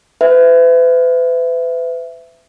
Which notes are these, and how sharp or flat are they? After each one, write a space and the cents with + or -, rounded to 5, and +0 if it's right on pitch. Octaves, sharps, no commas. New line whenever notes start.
B4 +40 E5 +15